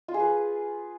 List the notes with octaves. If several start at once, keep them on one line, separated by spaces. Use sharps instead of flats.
F4
G#4
B4